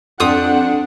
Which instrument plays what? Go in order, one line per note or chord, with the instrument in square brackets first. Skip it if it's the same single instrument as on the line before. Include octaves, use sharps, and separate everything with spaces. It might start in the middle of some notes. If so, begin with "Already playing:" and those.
[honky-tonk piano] F2 [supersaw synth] D4 [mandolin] F4 G4 D#6 [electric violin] F#5